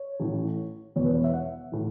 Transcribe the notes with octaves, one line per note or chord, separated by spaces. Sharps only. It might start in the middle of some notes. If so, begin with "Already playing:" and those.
Already playing: C#5
A1 A2 E3
E1 E2 B2 C#5
B4
C#5
E5
F#5
A2 E3